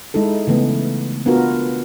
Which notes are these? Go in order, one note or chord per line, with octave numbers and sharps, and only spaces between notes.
G#3 D#4 E4 A4
C#3 E3 A3 B3
B3 D4 F4 F#4 A#4